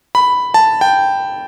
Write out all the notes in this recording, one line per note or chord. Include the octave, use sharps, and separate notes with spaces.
B5
A5
G5